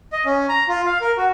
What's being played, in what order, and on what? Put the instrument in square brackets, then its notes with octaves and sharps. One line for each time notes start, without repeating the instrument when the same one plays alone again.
[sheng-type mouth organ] D#5
C#4
A#5
F4
F5
A#4
F#4